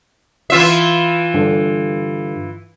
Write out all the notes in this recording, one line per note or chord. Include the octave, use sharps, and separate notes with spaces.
E3 F4 E5
G2 D3